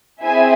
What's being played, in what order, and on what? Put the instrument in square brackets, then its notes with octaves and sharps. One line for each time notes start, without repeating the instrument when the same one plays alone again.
[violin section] C4 E4 G#4 E5 G#5